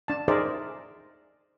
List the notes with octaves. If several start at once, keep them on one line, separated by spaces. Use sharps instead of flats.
D4 A5
D#4 G#4 A#4 C5 D5 E5